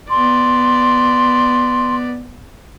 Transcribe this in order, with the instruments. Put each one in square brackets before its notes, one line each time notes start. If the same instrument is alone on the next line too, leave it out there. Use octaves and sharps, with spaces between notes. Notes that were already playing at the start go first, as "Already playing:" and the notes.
[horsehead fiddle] B3 D5 [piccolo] C6